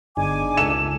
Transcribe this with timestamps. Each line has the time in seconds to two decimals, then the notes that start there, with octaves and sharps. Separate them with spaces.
0.17 G1 D4 D#4 G#4 G#5 D6
0.57 C#2 A4 E7